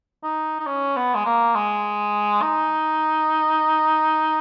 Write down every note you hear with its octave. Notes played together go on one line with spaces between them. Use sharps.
D#4
D#4
C#4
B3
G#3
A#3
G#3
D#4